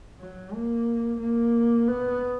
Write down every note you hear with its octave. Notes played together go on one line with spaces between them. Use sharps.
F#3
A#3
A#3
B3